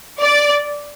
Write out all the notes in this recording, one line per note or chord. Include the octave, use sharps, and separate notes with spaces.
D5